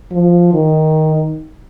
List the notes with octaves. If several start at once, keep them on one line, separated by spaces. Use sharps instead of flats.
F3
D#3